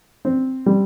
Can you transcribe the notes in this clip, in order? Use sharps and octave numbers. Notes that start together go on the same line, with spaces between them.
C4
G3